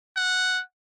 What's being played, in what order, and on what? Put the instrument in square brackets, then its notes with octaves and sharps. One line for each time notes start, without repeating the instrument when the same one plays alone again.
[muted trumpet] F#5